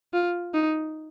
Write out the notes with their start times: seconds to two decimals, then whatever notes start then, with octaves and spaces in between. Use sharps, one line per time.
0.13 F4
0.54 D#4